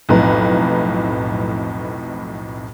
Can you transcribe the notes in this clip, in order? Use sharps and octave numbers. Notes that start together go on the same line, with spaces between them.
B1 F2 A2 B4 A#5